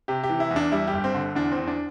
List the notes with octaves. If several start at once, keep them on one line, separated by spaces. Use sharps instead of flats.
C3 G4
G4
E3
E4
E2
D4
G3 E4
G4
G1
C4
D3
E2 D4
E2 C4
D4